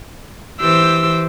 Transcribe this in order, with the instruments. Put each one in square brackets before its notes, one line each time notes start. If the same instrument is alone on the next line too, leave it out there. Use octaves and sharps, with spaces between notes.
[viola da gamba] E3 G4 C5 [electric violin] E6